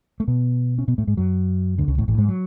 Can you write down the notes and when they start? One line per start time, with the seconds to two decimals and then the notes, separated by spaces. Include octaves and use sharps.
0.20 A3
0.28 B2 B3
0.78 C#4
0.88 B2 B3
0.98 A2 A3
1.07 G#2 G#3
1.17 F#2 F#3
1.78 D2 D3
1.88 C#2 C#3
1.98 A1 A2
2.08 A1 A2
2.18 G#2 G#3
2.29 F#3